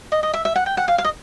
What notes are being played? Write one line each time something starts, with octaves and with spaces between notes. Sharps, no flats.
D#5
D#5
E5
E5
F#5
G5
F#5
F5
F5
D#5